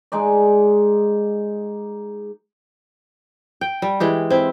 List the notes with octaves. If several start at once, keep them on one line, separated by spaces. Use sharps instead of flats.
G#3 D#4 D5
G5
G3
E3 G#3 G4
C4 E4